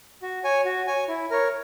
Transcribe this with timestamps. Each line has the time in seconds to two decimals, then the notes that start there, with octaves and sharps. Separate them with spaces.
0.22 F#4
0.44 C#5 G#5
0.65 F#4
0.87 C#5 G#5
1.08 E4
1.31 A#4 C#5